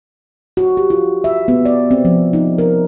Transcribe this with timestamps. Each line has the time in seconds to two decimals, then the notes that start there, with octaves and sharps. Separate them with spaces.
0.57 F#4
0.77 G4
0.90 F4
1.24 E5
1.48 B3
1.65 D5
1.91 C4
2.05 F3
2.33 D#4
2.58 A#4